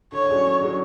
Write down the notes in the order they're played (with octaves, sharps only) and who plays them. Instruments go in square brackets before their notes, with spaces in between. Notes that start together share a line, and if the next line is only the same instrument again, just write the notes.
[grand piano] D3 [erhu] C#5
[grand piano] F#3 C#4 G#4 D5
D3
F#3 C#4 G#4 D5